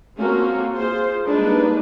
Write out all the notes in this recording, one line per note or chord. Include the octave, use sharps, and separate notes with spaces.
A#3 C4 C#4 F4 F#4 A4
F4 G#4 C5
G3 G#3 A#3 D4 D#4 B4